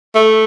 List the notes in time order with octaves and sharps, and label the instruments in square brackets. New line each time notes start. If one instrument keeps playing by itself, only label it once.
[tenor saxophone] A3